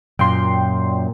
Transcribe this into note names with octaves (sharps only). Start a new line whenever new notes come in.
F#2 A#2 G5 C6